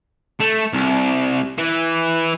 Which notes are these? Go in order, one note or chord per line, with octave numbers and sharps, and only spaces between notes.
A3
C2
E3